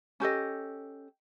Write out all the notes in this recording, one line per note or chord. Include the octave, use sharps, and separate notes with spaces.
C#4 G4 A4 D#5